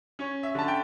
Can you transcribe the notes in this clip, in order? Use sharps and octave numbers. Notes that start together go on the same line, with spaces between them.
C#4 C#5
E5
D3 A5
G5